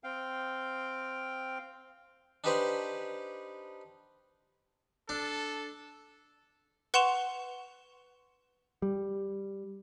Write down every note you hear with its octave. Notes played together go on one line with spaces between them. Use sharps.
C4 F5 G5
D4 D#4 G4 B4 C5 D5
D4 A4
B4 F#5 C6 C#6 E7 F7
G3